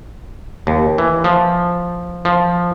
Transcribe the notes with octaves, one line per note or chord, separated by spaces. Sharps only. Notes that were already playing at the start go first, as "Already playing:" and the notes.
D#2
E3
F3
F3